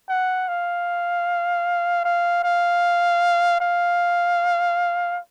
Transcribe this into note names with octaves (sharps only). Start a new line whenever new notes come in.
F#5
F5
F5
F5
F5